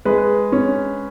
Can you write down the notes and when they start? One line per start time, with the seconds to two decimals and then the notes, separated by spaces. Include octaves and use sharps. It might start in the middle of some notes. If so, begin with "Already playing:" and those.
0.05 G#3 B4
0.52 C#4